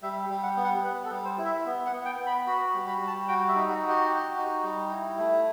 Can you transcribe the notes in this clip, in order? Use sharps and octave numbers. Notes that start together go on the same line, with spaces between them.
G3 E5
G3
F#5
B3
F#5
B3 B4
A4
G3
C5
E4
E5
B3
F#5
B3
G5
B3
B5
F#4 B5
G3
B5
G3
A5
F#4 G5
E5
D#4
F#4
F#4
G4
F#4
D#4
G3
E4
A3